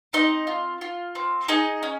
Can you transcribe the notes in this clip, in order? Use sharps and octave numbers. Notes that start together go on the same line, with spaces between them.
C4 D#4 D#5
F4
F4
C4
D#4 G#4 D#5
C#4